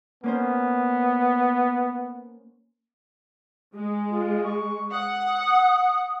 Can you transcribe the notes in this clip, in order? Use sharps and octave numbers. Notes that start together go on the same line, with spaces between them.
A#3 B3 C#4 C5
G#3
F4
C#6
F#5 D#6